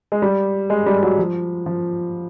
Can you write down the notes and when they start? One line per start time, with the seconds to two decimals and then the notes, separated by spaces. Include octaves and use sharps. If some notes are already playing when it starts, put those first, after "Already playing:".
0.12 G#3
0.22 G3
0.70 G#3
0.86 G3
1.03 F#3
1.18 F3
1.66 F3